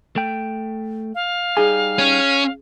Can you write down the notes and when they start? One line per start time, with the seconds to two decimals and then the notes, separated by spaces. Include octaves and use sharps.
0.16 A3 G5
1.15 F5
1.57 G3 D#4 G#4 G#5
1.98 C#4